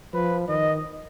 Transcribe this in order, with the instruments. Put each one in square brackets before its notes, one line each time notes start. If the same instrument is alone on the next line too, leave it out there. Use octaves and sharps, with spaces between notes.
[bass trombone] F3 [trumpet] B4
[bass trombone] D#3 [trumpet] D#5